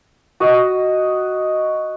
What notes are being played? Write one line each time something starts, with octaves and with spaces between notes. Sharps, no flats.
F#4 D#5